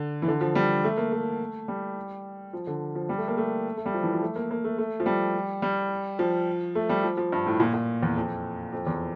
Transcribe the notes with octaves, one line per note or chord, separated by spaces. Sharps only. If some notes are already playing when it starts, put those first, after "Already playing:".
Already playing: D3
E3
D3
F3
G3
A3
A#3
A3
G3
F3
D3
F3
G3
A3
A#3
A3
A3
G3
F3
E3
F3
A3
A#3
A#3
A3
A3
F3
G3
G3
F3
A3
G3
F3
F3
G2
A2
A#2
A#2
E2
F2
F2
E2